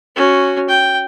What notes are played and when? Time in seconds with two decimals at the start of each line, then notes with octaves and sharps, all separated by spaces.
0.16 C#4 F#4
0.69 G5